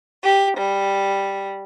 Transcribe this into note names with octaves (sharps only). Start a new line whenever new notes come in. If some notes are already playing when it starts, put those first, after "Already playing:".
G4
G3